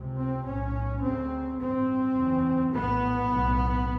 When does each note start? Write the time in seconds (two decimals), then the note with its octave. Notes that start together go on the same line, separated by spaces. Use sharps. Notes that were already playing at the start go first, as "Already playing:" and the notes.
Already playing: C#2 C3
0.18 C4
0.47 B1 A2 C#4
1.03 D2 C#3 C4
1.59 A1 G2 C4
2.17 F#1 E2 C#3
2.73 A#1 A2 B3
3.29 B1 A2